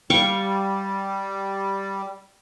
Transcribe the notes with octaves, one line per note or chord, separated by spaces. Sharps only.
G3 F5 G5 C#6